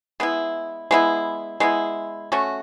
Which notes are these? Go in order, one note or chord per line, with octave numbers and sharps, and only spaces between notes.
G#3 B3 E4
G#3 B3 E4
G#3 B3 E4
A3 C#4 F#4